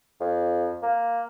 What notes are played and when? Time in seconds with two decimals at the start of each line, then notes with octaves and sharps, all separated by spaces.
0.21 F2
0.82 A#3